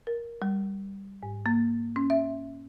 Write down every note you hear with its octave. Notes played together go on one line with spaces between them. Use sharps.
A#4
G3
G#2
A#3
C#4
E5